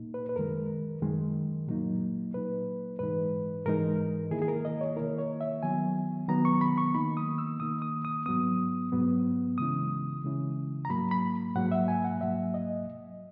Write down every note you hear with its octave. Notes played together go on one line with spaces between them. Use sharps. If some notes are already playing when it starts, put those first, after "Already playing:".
Already playing: A#2 A#3 D#4
B4
B4
F#2 D#3 G#3 A#4
F#2 D#3 G#3
A#2 F#3 A#3 D#4
A#2 F#3 A#3 D#4 B4
G#2 E3 G#3 D#4 B4
G#2 E3 G#3 D#4 A#4
D#3 A#3 E4 G#4
G#4
A#4
D#5
C#5
D#3 A#3 E4 A#4
C#5
E5
D#3 F#3 B3 G#5
D#3 F#3 B3 A#5
C#6
B5
C#6
D#3 A#3 D#4 B5
D#6
E6
D#3 A#3 D#4 D#6
D#6
D#6
G#2 F#3 B3 D#6
G#2 F#3 B3
C#3 E3 G#3 C#4 E4 D#6
C#3 E3 G#3 C#4 E4
A#5
G#2 F#3 A#3 B5
B5
G#2 F#3 A#3 F#5
E5
G#5
F#5
G#2 F#3 A#3 E5
D#5